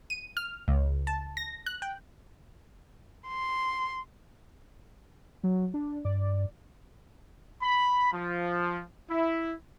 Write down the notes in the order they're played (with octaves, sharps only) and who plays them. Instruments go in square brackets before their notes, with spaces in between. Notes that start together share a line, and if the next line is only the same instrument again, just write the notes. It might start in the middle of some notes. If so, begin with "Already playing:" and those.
[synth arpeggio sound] D#7
F6
C#2
A5
A#6
F#6
G5
[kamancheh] C6
[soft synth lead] F#3
D4
[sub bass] G2 [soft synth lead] D5
[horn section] B5
F3
E4